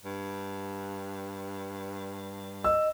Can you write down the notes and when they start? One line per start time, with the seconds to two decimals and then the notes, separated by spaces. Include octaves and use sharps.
0.05 G2
2.64 D#5 E6